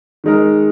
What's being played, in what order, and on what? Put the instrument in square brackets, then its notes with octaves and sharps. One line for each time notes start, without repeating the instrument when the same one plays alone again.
[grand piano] D#3 G#3 D#4 A#4